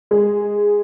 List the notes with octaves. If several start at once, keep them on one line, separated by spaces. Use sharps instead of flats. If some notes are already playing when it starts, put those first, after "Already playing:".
G#3